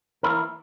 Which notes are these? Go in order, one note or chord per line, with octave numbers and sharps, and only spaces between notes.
E3 A#3 E4 A#4